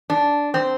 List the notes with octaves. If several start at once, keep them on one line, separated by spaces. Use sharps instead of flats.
D4
C4